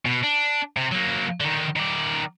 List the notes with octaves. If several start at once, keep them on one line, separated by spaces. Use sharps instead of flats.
B2
D4
C3
F#3 A#3
D3 D#3
D#3 D5